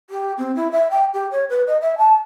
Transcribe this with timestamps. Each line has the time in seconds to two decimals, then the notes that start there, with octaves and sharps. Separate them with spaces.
0.10 G4
0.38 C4
0.56 E4
0.72 E5
0.91 G5
1.14 G4
1.32 C#5
1.50 B4
1.67 D#5
1.81 E5
1.98 A5